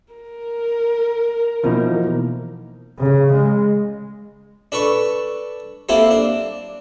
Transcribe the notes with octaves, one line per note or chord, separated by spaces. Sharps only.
A#4
B2 E3 F3 A#3 D#4
C#3
G#3
D4 A4 B4 C#6
A#3 C4 E4 G4 A4
D4